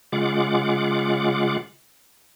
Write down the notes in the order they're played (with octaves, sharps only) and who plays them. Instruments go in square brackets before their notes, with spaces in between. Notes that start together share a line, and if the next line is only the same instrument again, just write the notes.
[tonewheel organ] C#3 G#3 F4 F#5 D6